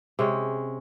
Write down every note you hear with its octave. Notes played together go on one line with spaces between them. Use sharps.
C3 G#3 C#4